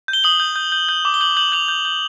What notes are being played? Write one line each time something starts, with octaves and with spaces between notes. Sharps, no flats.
G6
G7
D#6 F#7
G6
G6
G6
G6
D6
G7
G6 F#7
G6 F#7
G6 F7
G6
G6